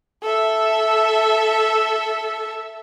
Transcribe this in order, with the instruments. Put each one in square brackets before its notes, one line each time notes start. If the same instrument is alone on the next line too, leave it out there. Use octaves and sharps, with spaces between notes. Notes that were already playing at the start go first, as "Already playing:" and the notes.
[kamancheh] A4 E5